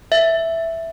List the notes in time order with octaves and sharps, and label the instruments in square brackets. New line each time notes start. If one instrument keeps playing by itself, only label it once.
[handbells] E5